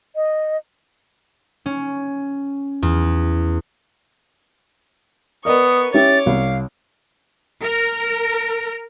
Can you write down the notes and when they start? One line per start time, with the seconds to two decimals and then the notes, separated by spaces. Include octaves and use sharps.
0.16 D#5
1.66 C#4
2.82 E2
5.45 B3 A#4 D5 D#5 C#6 D#6
5.94 C#4 E4 G4 C#5 D6 A6
6.26 C2 F5
7.63 A#4